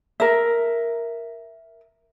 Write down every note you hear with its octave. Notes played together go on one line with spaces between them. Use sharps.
A#4 E5